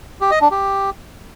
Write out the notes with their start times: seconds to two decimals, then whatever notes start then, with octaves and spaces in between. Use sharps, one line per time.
0.21 G4
0.31 D#5
0.41 D4
0.51 G4